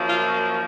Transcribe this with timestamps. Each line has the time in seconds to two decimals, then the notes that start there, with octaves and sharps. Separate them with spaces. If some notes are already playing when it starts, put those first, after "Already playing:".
Already playing: F#2 F3 A#3
0.09 F4